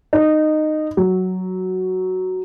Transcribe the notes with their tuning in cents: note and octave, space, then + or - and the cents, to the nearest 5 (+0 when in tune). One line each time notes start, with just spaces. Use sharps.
D#4 -15
F#3 +5